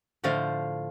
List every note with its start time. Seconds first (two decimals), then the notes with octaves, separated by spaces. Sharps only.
0.24 A2 D3 F3 A3 C5 F5